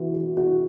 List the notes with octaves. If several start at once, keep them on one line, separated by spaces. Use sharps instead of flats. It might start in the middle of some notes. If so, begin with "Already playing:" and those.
Already playing: E3 F#4
F#4
F#4